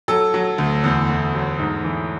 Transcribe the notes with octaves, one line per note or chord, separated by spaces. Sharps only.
F#3 A4
F#3
D2
E2
E2
F#3
G#2
E3